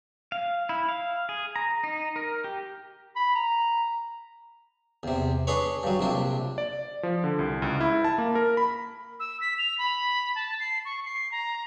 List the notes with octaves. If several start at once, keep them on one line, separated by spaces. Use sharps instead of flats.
F5
E4
F5
G#4
A#5
D#4
A#4
G4
B5
A#5
E2 C3
D4 G#4 B4 C#5
G2 F#3
A#1 C3 D4
D5
F3
D3
C2
C#2
E4
A5
A#3
A#4
B5
E6
B6
F7
B5
A5
C7
C#6
C7
A#5